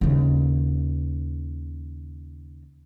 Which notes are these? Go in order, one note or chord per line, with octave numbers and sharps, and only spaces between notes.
D#2 C#3